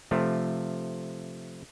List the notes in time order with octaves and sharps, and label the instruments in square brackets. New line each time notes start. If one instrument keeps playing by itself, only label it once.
[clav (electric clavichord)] C3 F3 A3